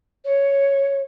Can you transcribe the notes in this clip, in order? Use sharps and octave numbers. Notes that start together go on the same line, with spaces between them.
C#5